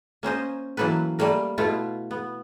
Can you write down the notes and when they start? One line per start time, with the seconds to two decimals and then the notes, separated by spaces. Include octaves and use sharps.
0.23 A#3 C#4 C5 D#5
0.77 E3 F#3 A#3 A4 B4
1.19 G3 A3 A#3 A#4
1.58 B2 A3 E4 F4
2.11 B3